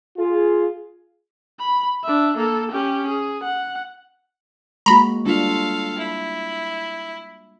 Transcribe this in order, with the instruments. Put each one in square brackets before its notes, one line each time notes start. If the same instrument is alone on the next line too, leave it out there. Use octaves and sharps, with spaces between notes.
[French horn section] F4 G#4
[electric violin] B5
D4 E5
A#3 A4
C#4 G4
G#4
F#5
[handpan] G#3 A#3 F#4 [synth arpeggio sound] A#5 B5
[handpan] G3 D4 F4 [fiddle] A4 F5
[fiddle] E4